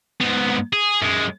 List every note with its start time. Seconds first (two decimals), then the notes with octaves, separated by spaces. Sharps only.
0.21 G#2 B3
0.73 G#4
1.02 F#2 G#3